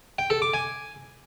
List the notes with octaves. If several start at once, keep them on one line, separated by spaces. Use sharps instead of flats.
G5
A4
D6
G#5